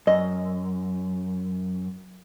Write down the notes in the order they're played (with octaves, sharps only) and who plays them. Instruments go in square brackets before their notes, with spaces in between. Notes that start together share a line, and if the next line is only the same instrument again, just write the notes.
[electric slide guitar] F#2 [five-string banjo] D#5